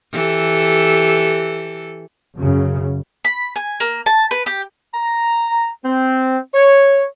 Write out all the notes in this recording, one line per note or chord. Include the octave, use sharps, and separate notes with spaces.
E3 G4 A4
F#2 C#3
B5
G#5
A#3
A5
B4
G4
A#5
C4
C#5